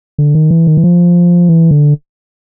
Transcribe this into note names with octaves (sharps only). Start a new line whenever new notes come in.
D3
D#3
E3
D#3
E3
F3
E3
D3